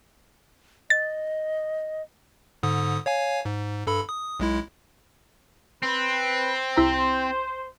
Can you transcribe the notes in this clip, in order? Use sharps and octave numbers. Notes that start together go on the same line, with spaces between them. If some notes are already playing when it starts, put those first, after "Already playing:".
D#5 A6
G#2 D3 D#6
C#5 F5 G#5
G#2
G2 A4 B5
D#6
B1 G#3 E4
C4 B4
C2 E4 C5 A#5